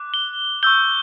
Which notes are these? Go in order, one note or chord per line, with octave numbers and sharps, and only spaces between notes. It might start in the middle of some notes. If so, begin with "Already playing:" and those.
Already playing: D6 F#6
G7
C#6 E6 G6 G7